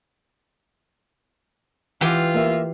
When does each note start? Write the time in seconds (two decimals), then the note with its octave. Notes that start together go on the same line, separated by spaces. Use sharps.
2.01 E3 F4 G4
2.34 A#3 E5